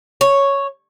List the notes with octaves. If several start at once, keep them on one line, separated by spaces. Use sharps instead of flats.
C#5